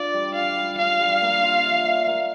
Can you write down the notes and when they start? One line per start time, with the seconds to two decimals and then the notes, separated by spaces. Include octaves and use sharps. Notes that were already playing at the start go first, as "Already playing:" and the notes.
Already playing: D4 F4 D5
0.14 G3
0.34 F4 F5
0.56 G3
0.78 D4 F5
1.00 G3
1.21 A#3
1.43 F4
1.64 E5
1.85 E5
2.06 A#3